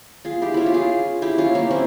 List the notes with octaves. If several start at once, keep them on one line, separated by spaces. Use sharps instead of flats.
F4 G#4
E4 G4
C#4 E4 F4
G4
F4 G#4
E4 G4
C#4 F4
A#3 C#4
C4 E4